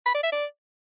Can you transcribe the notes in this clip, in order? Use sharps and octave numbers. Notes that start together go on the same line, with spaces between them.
B5
D5
E5
D5